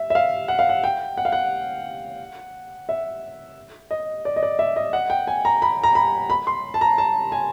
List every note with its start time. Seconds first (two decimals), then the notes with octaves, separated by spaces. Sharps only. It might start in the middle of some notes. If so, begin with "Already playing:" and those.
Already playing: E5
0.10 E5
0.15 F5
0.48 F#5
0.59 F5
0.69 F#5
0.84 G5
1.17 F#5
1.25 F5
1.32 F#5
2.89 E5
3.91 D#5
4.25 D5
4.36 D#5
4.43 D5
4.59 E5
4.76 D#5
4.93 F#5
5.10 G5
5.27 G#5
5.45 A#5
5.62 B5
5.83 A#5
5.95 B5
6.30 B5
6.47 C6
6.74 A5
6.81 A#5
6.98 A5
7.32 G#5